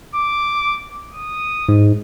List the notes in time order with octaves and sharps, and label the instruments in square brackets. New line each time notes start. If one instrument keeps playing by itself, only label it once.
[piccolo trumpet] D6
D#6
[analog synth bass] G#2